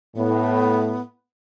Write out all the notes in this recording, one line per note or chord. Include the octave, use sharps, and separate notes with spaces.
A2 B3